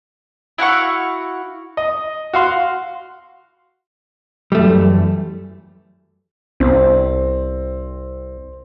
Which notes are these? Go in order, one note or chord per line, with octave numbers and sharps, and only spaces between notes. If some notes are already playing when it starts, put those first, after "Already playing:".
E4 F#4 F5 C#6
D#5
F#4 F5 C6
F#2 E3 G3 A3
C2 C4